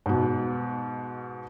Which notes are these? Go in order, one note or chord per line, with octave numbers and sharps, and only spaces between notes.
G#2 B2